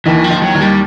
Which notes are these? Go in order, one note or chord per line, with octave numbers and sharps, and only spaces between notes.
D#2 D#3 E3
F3
D#2 D#3
F#3
D#2 D#3
G3